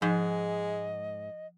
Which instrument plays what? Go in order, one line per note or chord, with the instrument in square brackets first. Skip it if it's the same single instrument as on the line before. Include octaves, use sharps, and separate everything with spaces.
[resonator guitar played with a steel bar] G#2 [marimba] F3 [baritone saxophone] G#3 [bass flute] D#5